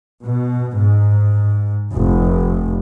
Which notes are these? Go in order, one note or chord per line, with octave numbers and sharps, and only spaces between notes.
B2
G#2
F1